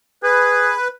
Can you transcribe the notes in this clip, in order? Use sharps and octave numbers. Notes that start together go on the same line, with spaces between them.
G#4 B4